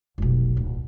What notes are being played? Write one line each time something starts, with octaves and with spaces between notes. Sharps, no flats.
F1 B1
D1